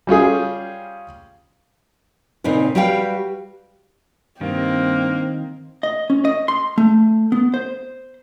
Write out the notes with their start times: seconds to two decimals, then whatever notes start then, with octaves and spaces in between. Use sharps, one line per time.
0.07 G3 C#4 F4 G#4
2.44 A#2 C#3 C4 D#4 B4
2.75 G3 F#4 G4 B4 F5 G5
4.41 G2 D#3 A#3 C4
5.83 D#5
6.10 C#4
6.25 D#5
6.48 C6
6.78 A3
7.32 B3
7.54 C5